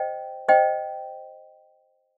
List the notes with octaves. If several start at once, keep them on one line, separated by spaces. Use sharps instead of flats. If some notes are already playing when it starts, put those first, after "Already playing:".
Already playing: C5 D#5 G5
C5 D#5 G5